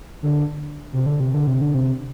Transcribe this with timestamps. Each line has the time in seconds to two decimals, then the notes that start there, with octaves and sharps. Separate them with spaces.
0.23 D3
0.93 C3
1.06 D3
1.20 C3
1.34 D3
1.47 C3
1.61 D3
1.75 C3